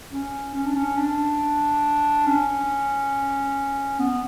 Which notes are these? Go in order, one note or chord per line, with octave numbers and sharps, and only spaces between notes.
C#4
C#4
D4
C#4
D4
C#4
B3